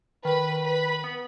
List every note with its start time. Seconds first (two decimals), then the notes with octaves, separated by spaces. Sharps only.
0.25 D#3 B4 B5
0.64 B4 B5
1.04 B3